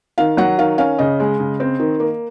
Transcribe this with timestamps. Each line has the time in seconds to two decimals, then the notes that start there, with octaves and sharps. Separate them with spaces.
0.18 D#3 F5
0.37 F#3 F#5
0.58 D#3 F5
0.78 C#4 F5
0.98 C#3 D#5
1.20 G#3
1.40 C#3
1.60 C4
1.80 D#3
2.00 A#3